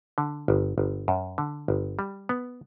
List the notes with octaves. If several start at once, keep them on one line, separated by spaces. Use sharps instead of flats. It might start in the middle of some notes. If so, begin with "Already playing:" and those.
D3
G1
G1
F#2
D3
G1
G3
B3